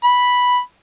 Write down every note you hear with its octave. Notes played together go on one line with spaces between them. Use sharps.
B5